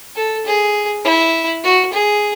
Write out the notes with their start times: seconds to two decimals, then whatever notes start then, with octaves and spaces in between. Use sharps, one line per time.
0.16 A4
0.45 G#4
1.05 E4
1.63 F#4
1.93 G#4